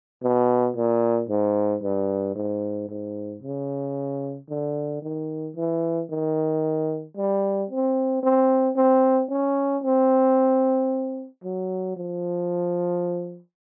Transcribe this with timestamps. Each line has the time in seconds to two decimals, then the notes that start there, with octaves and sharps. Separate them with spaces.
0.23 B2
0.76 A#2
1.29 G#2
1.83 G2
2.36 G#2
2.89 G#2
3.43 C#3
4.49 D3
5.02 D#3
5.56 E3
6.10 D#3
7.17 G3
7.70 C4
8.23 C4
8.76 C4
9.30 C#4
9.83 C4
11.44 F#3
11.97 F3